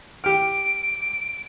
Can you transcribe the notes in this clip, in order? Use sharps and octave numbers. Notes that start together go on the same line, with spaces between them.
G4 F6 D7